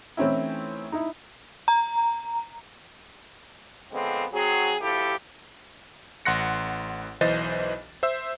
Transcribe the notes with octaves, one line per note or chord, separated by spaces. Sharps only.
E3 A3 C4 C#4 D#4 E4
D#4 E4
A#5
D3 F3 G#3 B3 C4
F#3 C4 F#4 G#4
D2 F3 E4 G4 A4
A1 F#5 C6 F#6 A#6 C#7
B1 E3 C5 D#5 A6
C5 E5 E6